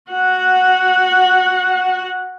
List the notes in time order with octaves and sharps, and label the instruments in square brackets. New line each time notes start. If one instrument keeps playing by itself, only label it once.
[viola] F#4 F#5